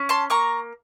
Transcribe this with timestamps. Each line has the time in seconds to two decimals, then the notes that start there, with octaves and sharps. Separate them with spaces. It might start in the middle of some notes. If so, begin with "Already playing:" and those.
Already playing: C#4
0.09 A5 C6
0.30 A#3 A#5 C#6